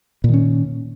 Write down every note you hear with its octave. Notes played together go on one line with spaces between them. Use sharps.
A#2 D#3 C#4